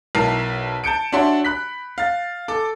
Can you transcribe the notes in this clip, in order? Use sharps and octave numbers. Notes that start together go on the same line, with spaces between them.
B1 E4 A#4 A5 F6 C7
A5 G6 C#7 D7
D4 F#4 C#5 E5 A5 C6
B5 F#6 B6
F5 A6
A4 D6